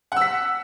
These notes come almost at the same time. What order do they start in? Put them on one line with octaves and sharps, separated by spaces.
F#5 E6 B6